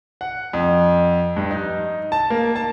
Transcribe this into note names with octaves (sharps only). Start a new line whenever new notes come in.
F#5
F2
G2
D#4
A5
A#3
A5